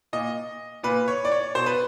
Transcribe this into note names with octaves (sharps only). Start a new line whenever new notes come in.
A#2 D#5
A#2 B4
C#5
D5
C#5
B2 C5
B4